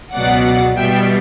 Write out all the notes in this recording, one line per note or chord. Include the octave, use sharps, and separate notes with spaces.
C#2 B2 F#3 D5 F#5
E2 B2 G3 B3 E5 G5